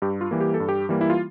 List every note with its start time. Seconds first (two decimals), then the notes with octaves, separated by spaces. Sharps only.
0.02 G2 G4
0.21 F4
0.31 E3 G3 A#3
0.40 G4
0.54 A4
0.60 G2
0.69 G4
0.89 E3 G3 A#3
1.01 E4
1.10 F4